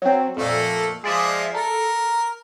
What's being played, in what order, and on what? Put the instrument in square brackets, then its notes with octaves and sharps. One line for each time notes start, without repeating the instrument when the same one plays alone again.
[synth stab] F#3 C4
[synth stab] F2 A#2 [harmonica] A3 A#3 A4
[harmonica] F3 G#3 F4 [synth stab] G#4 D5 E5
[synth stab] A4 [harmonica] A#4